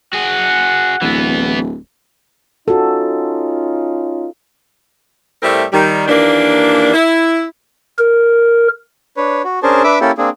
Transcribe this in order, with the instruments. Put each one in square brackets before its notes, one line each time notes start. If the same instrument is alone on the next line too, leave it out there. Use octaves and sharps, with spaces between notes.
[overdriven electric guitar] F#4 G#4 [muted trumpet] F#5
[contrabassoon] D1 [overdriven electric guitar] E3 B3
[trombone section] C#4 D#4 F4 [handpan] F#4 A4
[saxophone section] A2 G3 A3 C4 A#4 E5
D#3 G3
D#2 E3 A#3 D4
E4
[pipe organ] A#4
[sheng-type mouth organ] D4 B4 C#5
F#4
C#4 D4 G#4 A#4 C5 A5
D4 B4 E5 D6 E6
A#3 C#4 E4 G4 A4
A#3 C4 D4 G#4